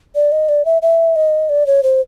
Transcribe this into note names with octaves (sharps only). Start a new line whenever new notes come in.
D5
D#5
D5
E5
E5
D#5
D5
C#5
C5